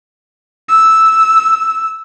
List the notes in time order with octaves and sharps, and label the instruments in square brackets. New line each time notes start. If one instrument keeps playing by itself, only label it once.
[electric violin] E6